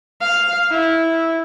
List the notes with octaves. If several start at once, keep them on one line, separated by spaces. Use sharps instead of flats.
F5
E4